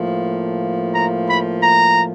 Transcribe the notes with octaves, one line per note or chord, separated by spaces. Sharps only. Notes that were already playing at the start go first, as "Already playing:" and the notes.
Already playing: A2 F3 A#3
A#5
B5
A#5